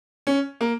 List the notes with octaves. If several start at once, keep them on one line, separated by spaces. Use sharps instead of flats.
C#4
A#3